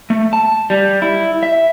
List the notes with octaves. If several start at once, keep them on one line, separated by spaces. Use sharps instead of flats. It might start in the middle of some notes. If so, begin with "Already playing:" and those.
A3
A5
G3
E4
E5